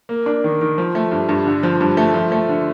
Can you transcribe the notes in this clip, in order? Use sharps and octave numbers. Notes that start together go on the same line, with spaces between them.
A#3
D4
D#3
D#3
F3
A3
G2
G2
D3
F3
G2
A3
F3
A3
D3